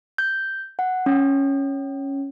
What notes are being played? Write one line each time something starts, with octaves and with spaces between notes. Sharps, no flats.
G6
F#5
C#4